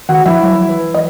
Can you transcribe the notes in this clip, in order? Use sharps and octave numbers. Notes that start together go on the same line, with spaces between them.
D#3 F#4 F#5
F3 E4 E5
F#3
E3
D#5